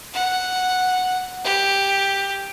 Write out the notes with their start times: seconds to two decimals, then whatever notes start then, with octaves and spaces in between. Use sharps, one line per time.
0.13 F#5
1.44 G4